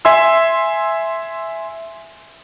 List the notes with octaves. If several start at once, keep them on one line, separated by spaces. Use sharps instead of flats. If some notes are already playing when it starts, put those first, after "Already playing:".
E5 G#5 C6 E6